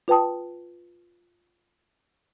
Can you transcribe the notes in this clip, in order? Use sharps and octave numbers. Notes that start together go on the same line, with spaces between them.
F4 B4 G5 A5 D#6